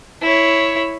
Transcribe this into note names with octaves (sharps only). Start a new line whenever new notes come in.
E4 C#5